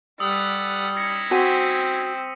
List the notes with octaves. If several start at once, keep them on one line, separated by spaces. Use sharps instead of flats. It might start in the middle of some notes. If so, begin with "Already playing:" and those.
G3 A4 B4 F#5 D#6 E6
C#4 D#4 E4 A#6 C#7
C4 F#4 G#5 B6 D#7